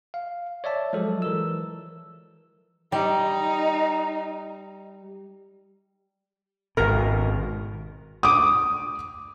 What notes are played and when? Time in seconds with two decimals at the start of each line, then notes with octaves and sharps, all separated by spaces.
0.14 F5
0.64 C#5 D5 E5 A5
0.93 F3 F#3 G#3 A4
1.22 E3 A#4 E6
2.92 G3 D#4
6.77 G#1 B2 A#4
8.23 D6 D#6